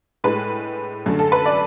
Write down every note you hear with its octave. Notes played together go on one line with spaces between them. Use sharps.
A2 G#3 B4
F#2 D3 A3
A4
B4
D5